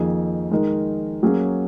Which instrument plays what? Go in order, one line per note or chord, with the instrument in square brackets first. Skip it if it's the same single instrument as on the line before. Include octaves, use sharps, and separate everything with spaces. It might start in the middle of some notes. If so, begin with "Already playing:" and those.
Already playing: [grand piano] F2 D#3 A#3 D#4 G#4
D#3 G#3 D#4 A#4
F#3 A#3 C#4 G#4